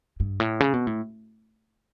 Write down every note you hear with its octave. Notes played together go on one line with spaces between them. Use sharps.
G2
A2
C#3
B2
A2